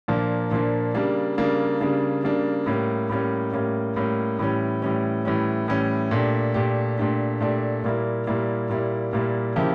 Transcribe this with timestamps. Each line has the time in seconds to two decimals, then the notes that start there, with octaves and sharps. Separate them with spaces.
0.08 A#2 F3 A#3 D4
0.51 A#2 F3 A#3 D4
0.94 C#3 G3 A#3 D4
1.38 C#3 G3 A#3 D4
1.80 C#3 G3 A#3 D4
2.24 C#3 G3 A#3 D4
2.66 A2 G3 A#3 C#4
3.09 A2 G3 A#3 C#4
3.53 A2 G3 A#3 C#4
3.96 A2 G3 A#3 C#4
4.39 A2 E3 G3 C#4
4.82 A2 E3 G3 C#4
5.25 A2 E3 G3 C#4
5.68 A2 E3 G3 C#4
6.11 A#2 A3 D4 G4
6.54 A#2 A3 D4 G4
6.97 A#2 A3 D4 G4
7.41 A#2 A3 D4 G4
7.83 A#2 G3 A#3 E4
8.27 A#2 G3 A#3 E4
8.69 A#2 G3 A#3 E4
9.13 A#2 G3 A#3 E4
9.56 C#3 F3 A#3 E4 G4